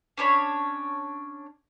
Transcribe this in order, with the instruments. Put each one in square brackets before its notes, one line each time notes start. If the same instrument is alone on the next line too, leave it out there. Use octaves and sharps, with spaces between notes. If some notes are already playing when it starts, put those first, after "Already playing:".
[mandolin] C#4 D4 C#5 B5